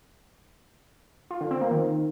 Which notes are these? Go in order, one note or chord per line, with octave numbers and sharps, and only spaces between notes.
F4
D3
C4
A#3
D#3